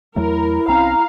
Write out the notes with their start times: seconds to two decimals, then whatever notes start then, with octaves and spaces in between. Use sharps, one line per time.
0.16 E2 F#3 A3 E4 A#4
0.68 C2 C4 C#4 F5 A#5